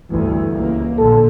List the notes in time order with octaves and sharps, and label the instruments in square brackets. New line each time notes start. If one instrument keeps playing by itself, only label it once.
[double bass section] G1 D2 G2 [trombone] E3
[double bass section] C#2 A#3
[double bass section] A#1 A#2 D3 [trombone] A4